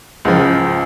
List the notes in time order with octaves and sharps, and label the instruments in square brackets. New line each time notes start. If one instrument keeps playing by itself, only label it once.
[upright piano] C#2 C#3 F3